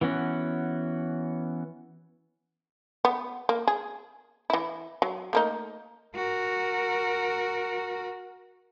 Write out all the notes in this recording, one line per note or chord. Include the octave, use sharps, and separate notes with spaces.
E3 B3 C#4 F#4
B3
A#3
G#4
E3 E4
F#3
A3 A#3 D#4
F#4 A#4